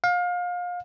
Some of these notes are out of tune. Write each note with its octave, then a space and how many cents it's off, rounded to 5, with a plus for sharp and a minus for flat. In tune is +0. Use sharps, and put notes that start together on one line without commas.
F5 +30